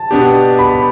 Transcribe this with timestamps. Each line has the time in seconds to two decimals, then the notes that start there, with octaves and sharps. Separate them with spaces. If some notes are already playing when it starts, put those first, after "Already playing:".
Already playing: A5
0.11 B2 B3 D4 G4
0.59 B5